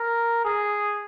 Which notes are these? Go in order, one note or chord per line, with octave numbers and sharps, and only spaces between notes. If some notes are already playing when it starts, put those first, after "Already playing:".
Already playing: A#4
G#4